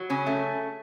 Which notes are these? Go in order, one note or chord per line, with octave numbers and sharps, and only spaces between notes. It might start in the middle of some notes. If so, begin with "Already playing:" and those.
Already playing: F#3
C#3 C#4
A3